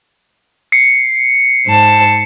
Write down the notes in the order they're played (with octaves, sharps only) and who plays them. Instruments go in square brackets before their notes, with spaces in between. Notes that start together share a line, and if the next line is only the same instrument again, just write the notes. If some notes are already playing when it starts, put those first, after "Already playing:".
[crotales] C7 C#7
[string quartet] G#2 C5 A5